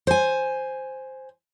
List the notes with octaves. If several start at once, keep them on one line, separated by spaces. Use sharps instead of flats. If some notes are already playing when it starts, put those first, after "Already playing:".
C5 G#5